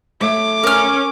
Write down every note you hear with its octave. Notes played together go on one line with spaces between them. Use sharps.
A3 C#5 E5 D6
C#4 A#4 F6